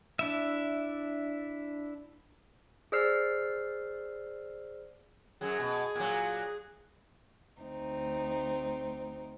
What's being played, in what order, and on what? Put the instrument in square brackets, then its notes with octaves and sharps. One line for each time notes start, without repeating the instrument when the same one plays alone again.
[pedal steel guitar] D4 E4 E5
[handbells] G#4 C5 D5 E6 F6 C7
[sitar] F#2 F#3 [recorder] G#4
[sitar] B2
A#2 F#3
[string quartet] D2 C4 D#4